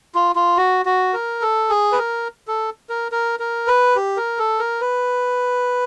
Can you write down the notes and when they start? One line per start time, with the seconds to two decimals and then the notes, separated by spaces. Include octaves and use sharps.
0.15 F4
0.36 F4
0.58 F#4
0.86 F#4
1.14 A#4
1.42 A4
1.70 G#4
1.92 B4
1.98 A#4
2.48 A4
2.89 A#4
3.12 A#4
3.40 A#4
3.67 B4
3.96 G4
4.17 A#4
4.39 A4
4.59 A#4
4.81 B4